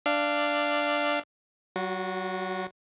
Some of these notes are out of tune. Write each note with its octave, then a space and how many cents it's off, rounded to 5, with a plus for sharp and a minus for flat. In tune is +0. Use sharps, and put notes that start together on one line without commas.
D4 +0 D5 +0 F5 -20
F#3 +35 F#4 -20